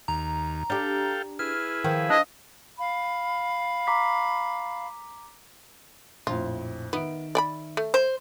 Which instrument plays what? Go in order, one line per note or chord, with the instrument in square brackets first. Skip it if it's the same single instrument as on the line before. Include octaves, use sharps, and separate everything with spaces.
[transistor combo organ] D#2 [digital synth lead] A#5
[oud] D4 G4 [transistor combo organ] A4 F5 G5
[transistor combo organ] E4 G#4 B4 [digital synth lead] F6
[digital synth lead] D#3 [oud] F3
[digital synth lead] D4 [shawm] D#5
[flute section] F5 B5
[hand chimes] A#5 D6 B6
[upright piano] A#1 F2 A2 [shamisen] F4
[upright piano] D#3 E5 D7 [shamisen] B3
[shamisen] D5 G5 B5
A3
[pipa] C5